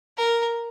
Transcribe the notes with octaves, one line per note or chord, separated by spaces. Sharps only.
A#4